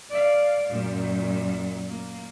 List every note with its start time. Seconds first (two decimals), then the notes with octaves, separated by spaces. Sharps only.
0.10 D5 F5
0.70 F#2 A#2
1.88 A#3